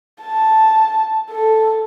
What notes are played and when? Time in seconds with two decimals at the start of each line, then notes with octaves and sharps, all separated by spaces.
0.23 A5
1.30 A4